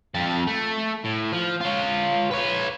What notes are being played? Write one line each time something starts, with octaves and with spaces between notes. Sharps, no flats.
F2 A5
A3
A2
F3
F4 C#5
B4 C#5